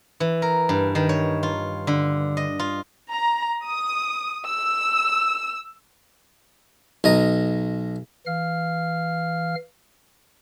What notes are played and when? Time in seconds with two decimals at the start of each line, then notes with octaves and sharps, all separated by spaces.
0.20 E3
0.42 A#4
0.69 G2
0.95 D#3
1.09 C#5
1.43 F4
1.87 D3
2.37 D#5
2.59 F4
3.11 A#5
3.65 D#6
4.46 E6
7.04 B1 D#5 A#5
8.26 E3 F5 F6